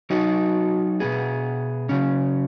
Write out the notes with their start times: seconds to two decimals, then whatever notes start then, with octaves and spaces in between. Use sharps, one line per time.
0.10 F#3 D#4 F#4
1.00 B2 B3 G#4
1.89 C#3 F#3 C#4